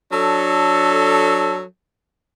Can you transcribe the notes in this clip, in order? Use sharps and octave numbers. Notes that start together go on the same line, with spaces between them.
F#3 D4 A4